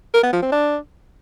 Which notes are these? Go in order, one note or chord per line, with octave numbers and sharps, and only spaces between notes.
A#4
B3
F3
C4
D4